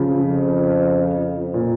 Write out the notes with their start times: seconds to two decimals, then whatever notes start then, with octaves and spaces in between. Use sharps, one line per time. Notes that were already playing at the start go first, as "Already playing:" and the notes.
Already playing: C#3 F3
0.21 F2
1.54 A#2